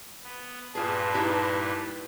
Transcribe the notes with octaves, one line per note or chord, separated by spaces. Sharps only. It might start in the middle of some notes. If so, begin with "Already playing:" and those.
B3
G2 A#2 F4 G#4 B4 A5
D#4 E4 G4